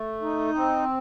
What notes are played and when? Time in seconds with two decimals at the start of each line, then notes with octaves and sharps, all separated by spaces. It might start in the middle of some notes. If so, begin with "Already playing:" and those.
Already playing: A3
0.22 D#4
0.54 C4